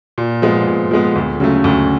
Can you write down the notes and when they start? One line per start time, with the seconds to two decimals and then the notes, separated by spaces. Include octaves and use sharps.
0.18 A#2
0.42 F3 G#3 B3
0.67 A#2
0.91 F3 G#3 B3
1.16 D2
1.40 C#3 F#3 A3
1.64 D2